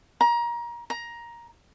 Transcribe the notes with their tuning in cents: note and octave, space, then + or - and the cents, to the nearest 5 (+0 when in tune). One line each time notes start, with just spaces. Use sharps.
A#5 +25
A#5 +15